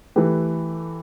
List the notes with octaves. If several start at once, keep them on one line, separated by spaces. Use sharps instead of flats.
E3 A3 G4 B4